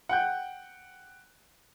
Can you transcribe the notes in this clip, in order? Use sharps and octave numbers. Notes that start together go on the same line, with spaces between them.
F#5 G5 G6